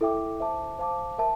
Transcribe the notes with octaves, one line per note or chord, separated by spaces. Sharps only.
E4 A4 E5 G5 D6
C5 E5 A5 D6
C5 F5 A5 D6
A#4 E5 A5